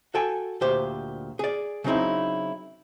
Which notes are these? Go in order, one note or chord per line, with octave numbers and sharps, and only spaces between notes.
F#4 A4 G5 G#5
D2 A#2 G4 C5
G#4 D5
C#3 F#3 C4 D#4 E4